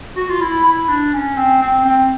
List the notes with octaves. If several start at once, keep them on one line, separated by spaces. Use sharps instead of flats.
F#4
F4
E4
E4
D4
C#4
C4
C4
C4